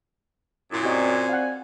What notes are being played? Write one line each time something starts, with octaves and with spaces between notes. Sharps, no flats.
F#2 A#2 E4
C4 F#4 G4 C5 D5 D#5 G#5
F5 F#5